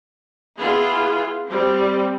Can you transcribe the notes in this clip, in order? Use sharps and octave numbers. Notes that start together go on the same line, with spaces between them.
B3 E4 F4 G#4
G3 C4